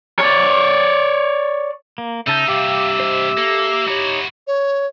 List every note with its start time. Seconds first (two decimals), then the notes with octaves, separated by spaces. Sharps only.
0.19 C#5 D5
1.98 A#3
2.27 C#3 D#4 E5 A5 G6
2.48 G2 C3 G4 F5 G5 D6
3.00 C5 D#5
3.38 A#3 A4
3.88 D#4 E4 F#4 C#5
4.47 C#5